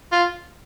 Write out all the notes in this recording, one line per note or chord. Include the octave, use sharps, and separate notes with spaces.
F4